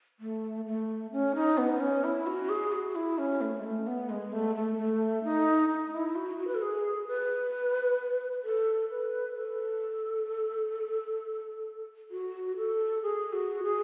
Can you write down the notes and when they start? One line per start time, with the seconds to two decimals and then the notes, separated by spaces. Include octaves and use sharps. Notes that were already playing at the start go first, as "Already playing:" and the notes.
0.20 A3
0.66 A3
1.12 C#4
1.35 D#4
1.58 B3
1.80 C#4
2.04 E4
2.27 F#4
2.49 G#4
2.72 F#4
2.95 E4
3.18 C#4
3.41 A3
3.60 G#3
3.64 A3
3.87 B3
4.10 G#3
4.32 A3
4.55 A3
4.78 A3
5.24 D#4
5.70 D#4
5.93 E4
6.16 F#4
6.38 F#4
6.47 B4
6.55 A4
6.62 G#4
7.07 B4
8.44 A4
8.90 B4
9.36 A4
12.11 F#4
12.57 A4
13.03 G#4
13.33 F#4
13.64 G#4